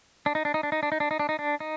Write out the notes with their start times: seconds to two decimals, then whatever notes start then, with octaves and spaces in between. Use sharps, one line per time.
0.26 D4
0.35 D#4
0.45 D4
0.54 D#4
0.63 D4
0.72 D#4
0.83 D4
0.92 D#4
1.00 D4
1.11 D#4
1.19 D4
1.29 D#4
1.39 D4
1.60 D#4